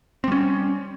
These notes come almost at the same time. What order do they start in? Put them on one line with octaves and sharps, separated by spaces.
C4 G3 C#4